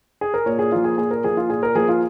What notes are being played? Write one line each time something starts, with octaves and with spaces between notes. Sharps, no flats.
G#4
A#4
A#2 C#5
G#4
F3 A#3 F4
G#4
A#2 G#4
A#4
F3 A#3 G#4
F4
A#2 G#4
A#4
F3 A#3 G#4
F4